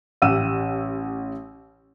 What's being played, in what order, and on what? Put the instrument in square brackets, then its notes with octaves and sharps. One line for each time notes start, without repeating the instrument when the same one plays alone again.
[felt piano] A1 G4 F#5 E6 D#7 E7